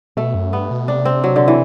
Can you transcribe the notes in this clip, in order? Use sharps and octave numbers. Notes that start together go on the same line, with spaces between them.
B2 A3
F#2
G2 B3
B2
C3 D4
C4
F#3
D3
E3